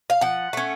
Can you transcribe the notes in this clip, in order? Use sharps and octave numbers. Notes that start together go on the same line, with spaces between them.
F5
F3 F#5
A3 C#4